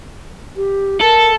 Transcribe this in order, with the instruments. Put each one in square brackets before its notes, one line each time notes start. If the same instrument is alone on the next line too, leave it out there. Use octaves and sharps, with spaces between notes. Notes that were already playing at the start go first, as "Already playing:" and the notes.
[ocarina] G4
[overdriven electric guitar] A4 [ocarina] A#4